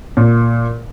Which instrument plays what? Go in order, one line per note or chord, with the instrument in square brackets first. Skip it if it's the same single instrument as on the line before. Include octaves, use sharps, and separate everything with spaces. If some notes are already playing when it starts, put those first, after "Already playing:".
[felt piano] A#2